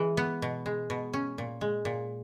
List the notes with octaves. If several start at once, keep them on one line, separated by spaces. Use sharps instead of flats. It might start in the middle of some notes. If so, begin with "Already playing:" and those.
Already playing: E3 G#3
B3
B2
G#3
B2
C#4
A#2
G#3
A#2